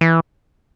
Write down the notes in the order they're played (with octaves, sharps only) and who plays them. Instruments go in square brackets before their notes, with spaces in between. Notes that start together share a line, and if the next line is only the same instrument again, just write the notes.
[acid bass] E3